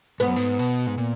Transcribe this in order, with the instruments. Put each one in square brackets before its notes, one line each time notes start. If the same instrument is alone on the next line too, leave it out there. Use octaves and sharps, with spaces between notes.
[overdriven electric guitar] G#2 [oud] B3
[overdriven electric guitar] F#2
G#2
B2
G#2
A#2